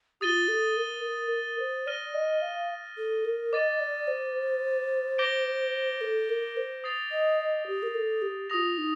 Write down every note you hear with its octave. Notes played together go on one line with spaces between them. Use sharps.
F4 G4 D#6 A6 D#7 G7
A4
A#4
A#4
A#4
C5
D5 F6 A#6 D#7 G7
D#5
F5
A4
A#4
D#5 D6 A6 D#7
D5
C5
D6 G6 A#6 D7 G7
A4
A#4
C5
D#6 A6 C7 F7
D#5
D#5
G4
A#4
A4
G4
F4 G4 D#6 A#6 F7
D#4